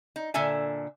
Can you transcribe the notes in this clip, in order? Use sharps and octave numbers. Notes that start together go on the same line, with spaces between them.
D#4
A#2 D3 A4 E5 G#5